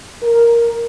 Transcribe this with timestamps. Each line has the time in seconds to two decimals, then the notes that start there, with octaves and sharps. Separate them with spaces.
0.23 A#4